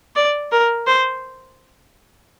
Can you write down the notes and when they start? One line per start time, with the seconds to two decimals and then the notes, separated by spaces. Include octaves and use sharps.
0.16 D5
0.51 A#4
0.87 C5